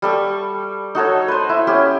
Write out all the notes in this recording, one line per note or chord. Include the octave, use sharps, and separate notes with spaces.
G3 A4 C#6
D#4 F#4 A4 C#5
B4 C5
E4
C#4 G4